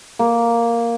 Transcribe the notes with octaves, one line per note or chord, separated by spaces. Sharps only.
A#3